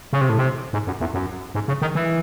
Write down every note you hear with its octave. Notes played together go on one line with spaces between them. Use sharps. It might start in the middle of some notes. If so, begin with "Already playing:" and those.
C#3
C3
A2
C3
G#2
F#2
E2
F#2
G#2
C#3
D#3
E3